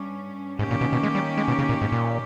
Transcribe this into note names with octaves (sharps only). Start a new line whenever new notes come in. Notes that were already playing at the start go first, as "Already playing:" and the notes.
Already playing: G2 G3 C#4
G#2 D#3 A#3 C#4 G4
A#2
B2
B2
G#3
G3
G#3
B2
C#3
A#2
G#2
A#2